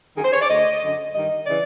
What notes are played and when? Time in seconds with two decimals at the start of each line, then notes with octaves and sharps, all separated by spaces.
0.17 F#2 D#3 G#4
0.25 C5
0.33 C#5
0.41 D5
0.49 D2 D3 D#5
0.81 F#2 D3
1.14 G2 D#3 D#5
1.46 C#3 E3 D5